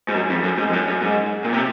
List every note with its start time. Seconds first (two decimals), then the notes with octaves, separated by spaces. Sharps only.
0.09 G#2
0.15 F#2
0.30 F2
0.43 F#2
0.58 G#2
0.69 F2
0.73 F#2
0.88 F#2
1.02 G#2
1.45 A#2
1.53 C3